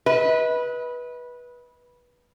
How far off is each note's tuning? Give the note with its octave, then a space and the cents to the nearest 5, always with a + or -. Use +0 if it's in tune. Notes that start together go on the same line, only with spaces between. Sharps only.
B4 -15 D#5 +40